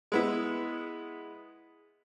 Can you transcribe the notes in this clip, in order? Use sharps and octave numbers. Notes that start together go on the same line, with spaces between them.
G#3 B3 E4